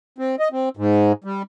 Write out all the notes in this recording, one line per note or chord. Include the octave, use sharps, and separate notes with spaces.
C4
D#5
C4
G#2
G3